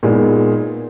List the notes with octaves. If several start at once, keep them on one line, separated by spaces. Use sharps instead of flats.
A#2 G#3 B3 D#4